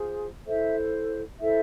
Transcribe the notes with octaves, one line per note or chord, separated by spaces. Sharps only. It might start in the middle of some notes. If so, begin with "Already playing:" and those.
Already playing: F4 G#4 C5
E4 A4 C5 E5
E4 A4 C5 E5